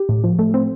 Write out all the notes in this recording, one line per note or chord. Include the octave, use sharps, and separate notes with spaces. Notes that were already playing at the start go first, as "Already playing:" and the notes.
Already playing: G4
A2
F3
A3
C4